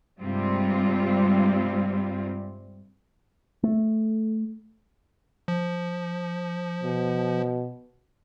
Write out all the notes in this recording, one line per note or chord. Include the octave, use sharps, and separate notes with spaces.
G2 C3 G3 G#3 C4 F4
A3
F3
B2